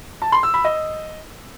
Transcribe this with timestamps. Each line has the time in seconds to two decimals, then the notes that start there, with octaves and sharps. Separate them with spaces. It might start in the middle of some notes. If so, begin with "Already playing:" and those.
0.22 A5
0.32 C6
0.43 E6
0.54 B5
0.64 D#5